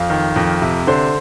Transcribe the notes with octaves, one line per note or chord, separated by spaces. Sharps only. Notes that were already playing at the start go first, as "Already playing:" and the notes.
Already playing: F2 F5
D#3
F2
C3
D3 C5